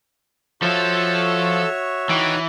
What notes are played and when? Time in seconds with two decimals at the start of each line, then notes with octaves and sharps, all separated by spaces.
0.62 F3 F#4 A4 C#5 E5 A5
2.09 E3 D#4 G5